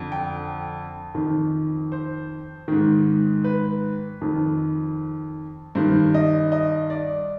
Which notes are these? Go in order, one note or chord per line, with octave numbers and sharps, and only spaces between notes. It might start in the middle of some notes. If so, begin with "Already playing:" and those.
Already playing: F2 D3
G5
F2 D#3
C5
G#2 D#3
B4
F2 D#3
G2 D#3 C5
D#5
D#5
D5